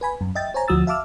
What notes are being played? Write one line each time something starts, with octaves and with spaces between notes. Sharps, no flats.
B4 G#5 B5
F#2
D#5 E5 G5 A6
C5 C#5 G#5 A#5
D2 F3 F#4 D#6 E6 A6
E5 F5 A5 D6 E6 F6